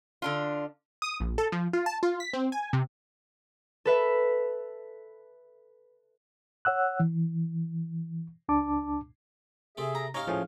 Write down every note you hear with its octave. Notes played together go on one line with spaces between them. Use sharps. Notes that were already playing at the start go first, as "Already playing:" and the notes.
D3 D4 F4
D#6
A#1
A4
F3
F4
A5
F4
B6
C4
G#5
C3
A4 B4 E5
C#5 F#5 E6 F#6
E3
C#2 D4 A5 D6
C3 C4 G#4 A4 E5
A#5
G#2 C#4 D#4 G4 C#5 F5 A#5
A2 F3 C#4 G#4